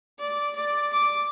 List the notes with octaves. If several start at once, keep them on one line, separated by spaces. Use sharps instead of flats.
D5
D5
D6